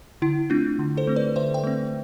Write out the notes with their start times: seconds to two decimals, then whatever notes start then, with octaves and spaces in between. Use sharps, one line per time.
0.22 D3 E4
0.50 A3 C4 D4 F4
0.79 D3
0.97 A4 C5
1.07 A3 C4
1.16 B4 D5
1.36 D3 C5 E5
1.54 E5 G5
1.63 A3 C4